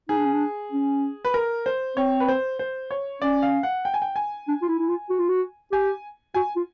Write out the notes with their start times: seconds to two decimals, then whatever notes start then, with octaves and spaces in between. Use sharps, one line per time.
0.08 D#4 G#4
0.17 D4
0.25 C#4
0.33 D4
0.72 C#4
1.25 B4
1.34 A#4
1.66 C5
1.97 C4 C#5
2.20 B4
2.28 C5
2.59 C5
2.91 C#5
3.22 C#4 D5
3.42 F5
3.63 F#5
3.85 G5
3.94 G#5
4.02 G5
4.16 G#5
4.48 D4
4.62 F4
4.68 E4
4.79 E4
4.89 F4
5.10 F#4
5.19 F4
5.29 F#4
5.72 G4 G#5
6.34 F#4 G#5
6.56 F4